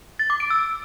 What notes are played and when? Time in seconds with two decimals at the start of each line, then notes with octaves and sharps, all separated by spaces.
0.19 A6
0.30 D6
0.40 D7
0.50 E6